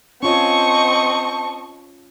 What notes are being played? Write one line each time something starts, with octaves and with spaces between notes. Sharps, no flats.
C4 C#4 F4 C#5 D#5 A5 C#6